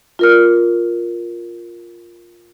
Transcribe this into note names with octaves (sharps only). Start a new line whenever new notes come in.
F4 A#4 F6